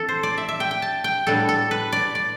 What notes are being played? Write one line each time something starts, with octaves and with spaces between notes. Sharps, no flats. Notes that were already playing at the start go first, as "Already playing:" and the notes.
Already playing: E3 C4 A4
C5
D5
E5
E5
G5
G5
A5
G5
A2 G3 B3 D4 A4
A4
B4
D5
D5